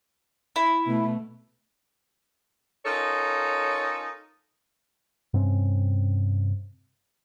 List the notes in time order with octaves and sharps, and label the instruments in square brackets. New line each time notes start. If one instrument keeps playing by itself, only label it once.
[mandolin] E4
[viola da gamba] B2 A3
[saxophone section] C#4 D#4 F4 A4 A#4 C#5
[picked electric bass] G2 C3 C4 C#4